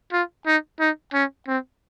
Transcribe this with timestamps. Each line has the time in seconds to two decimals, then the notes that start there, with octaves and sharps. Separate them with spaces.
0.12 F4
0.46 D#4
0.80 D#4
1.13 C#4
1.47 C4